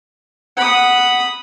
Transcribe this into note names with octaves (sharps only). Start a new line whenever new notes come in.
F#5 B5 D#6